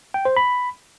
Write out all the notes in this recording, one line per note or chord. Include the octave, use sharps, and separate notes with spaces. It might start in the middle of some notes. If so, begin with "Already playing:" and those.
G5
C5
B5